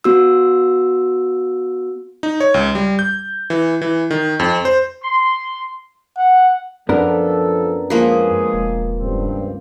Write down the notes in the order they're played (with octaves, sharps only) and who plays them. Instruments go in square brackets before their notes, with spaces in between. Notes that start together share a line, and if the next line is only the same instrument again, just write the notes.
[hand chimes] B3 F#4 E6
[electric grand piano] D#4
C#5
C#2
G3
G6
E3
E3
D#3
F2
C5
[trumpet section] C6
[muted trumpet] F#5
[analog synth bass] F#2 [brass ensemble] F3 A4 [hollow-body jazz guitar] B3 D4 A#4
[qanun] F3 A#3 B4 [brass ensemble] G#3 G#4
[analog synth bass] E1
[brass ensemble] C#2 G2 C4